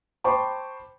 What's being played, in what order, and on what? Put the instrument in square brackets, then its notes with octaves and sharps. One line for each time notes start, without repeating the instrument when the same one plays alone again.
[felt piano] C5 G5 A5 B5 C#6 D6